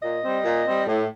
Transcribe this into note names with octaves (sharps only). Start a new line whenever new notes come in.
A#2 D#5
G3 C4
A#2
G3 C4
A2